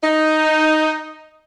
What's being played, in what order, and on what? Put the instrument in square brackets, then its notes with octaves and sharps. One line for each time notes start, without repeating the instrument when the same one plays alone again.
[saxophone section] D#4